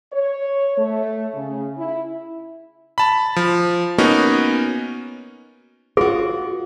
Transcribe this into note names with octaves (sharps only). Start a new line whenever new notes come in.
C#5
A3
C#3
E4
A5 B5
F3
A#3 B3 C#4 D#4 F#4
F4 F#4 G#4